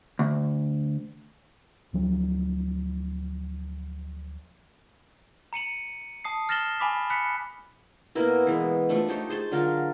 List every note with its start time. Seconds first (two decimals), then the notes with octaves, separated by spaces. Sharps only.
0.19 D2
1.93 D2 F3 F#3
5.53 A#5 C#7 D#7 F#7
6.24 A5 D#6 C7
6.49 F6 A6 A#6 E7 F#7 G7
6.80 G#5 B5 D6 B6
7.10 B5 F#6 B6 C#7
8.15 B2 A#3 E4 A#4
8.47 E3 G#3
8.89 F3 A3 D4
9.08 D#4 G4 C5 C#5
9.29 G#4 C5 A5 C6
9.52 D3 F#3 F4 A#4